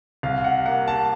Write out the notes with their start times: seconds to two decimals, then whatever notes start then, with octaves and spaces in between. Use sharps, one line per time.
0.23 C2 F5
0.44 F#5
0.66 A#3 F#5
0.88 A5